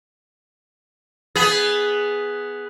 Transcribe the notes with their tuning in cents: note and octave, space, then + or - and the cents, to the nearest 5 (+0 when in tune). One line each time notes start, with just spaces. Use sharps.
B3 +0 G#4 +0